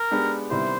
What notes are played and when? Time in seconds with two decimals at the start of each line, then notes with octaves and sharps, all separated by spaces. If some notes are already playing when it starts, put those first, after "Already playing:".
Already playing: A#4
0.11 G#3 B3 D4 G4
0.50 C3 D#3 G3 B3 E4 C5